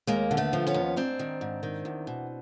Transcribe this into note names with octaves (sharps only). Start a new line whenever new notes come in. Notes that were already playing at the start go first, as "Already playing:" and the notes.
D#2 G#3 A#3
D3
A3 B3
F3
B3 C#4
D#2
G#2 C4 D4
D#3
G#2
D#3
E2
B2